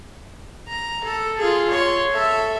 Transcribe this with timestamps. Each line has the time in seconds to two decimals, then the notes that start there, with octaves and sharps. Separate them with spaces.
0.68 A#5
1.04 A4
1.38 F4 G#4
1.70 C#5 C6
2.12 A4 E5